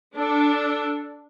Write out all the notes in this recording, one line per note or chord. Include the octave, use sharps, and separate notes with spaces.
D4 A4